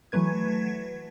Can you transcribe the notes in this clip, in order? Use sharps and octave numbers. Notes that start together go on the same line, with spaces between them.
E3 F#3 A3 B4 G#6